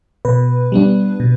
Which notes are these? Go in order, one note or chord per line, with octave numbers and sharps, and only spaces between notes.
B2 B4
G3 B3 D4
B2